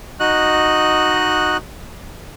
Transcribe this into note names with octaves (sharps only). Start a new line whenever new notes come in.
D#4 F#4 D#5 F#6